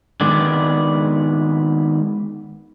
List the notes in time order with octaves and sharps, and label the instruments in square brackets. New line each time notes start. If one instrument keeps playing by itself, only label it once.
[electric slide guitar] D#3 G#3 B3 D4 D5